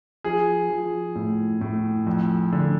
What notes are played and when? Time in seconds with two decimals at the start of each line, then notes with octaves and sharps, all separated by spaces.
0.24 F3 G#4
0.70 F3
1.15 A2
1.61 A2
2.07 F2
2.53 D3